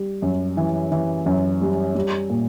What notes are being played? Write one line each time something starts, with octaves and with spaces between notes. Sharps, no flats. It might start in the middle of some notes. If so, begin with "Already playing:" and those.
Already playing: G3
F#2
E3
E3
F#2
G3
G3
A#2